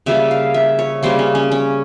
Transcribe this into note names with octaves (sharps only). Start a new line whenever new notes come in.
C#3 G3 A#3 E5
F5
E5
C#5
C#3 G3 A#3 C5
C#4
C#4
C#4